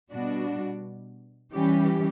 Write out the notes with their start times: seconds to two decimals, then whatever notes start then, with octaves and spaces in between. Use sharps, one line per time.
0.10 B2 G3 D4 F#4
1.53 E3 G3 C#4 G4